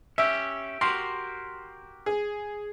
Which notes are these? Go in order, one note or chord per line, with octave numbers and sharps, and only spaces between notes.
C#4 G4 E5
F#4 G4 A#4 C6
G#4